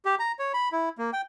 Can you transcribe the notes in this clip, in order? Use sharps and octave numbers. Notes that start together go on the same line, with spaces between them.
G4
A#5
C#5
B5
E4
A#3
G5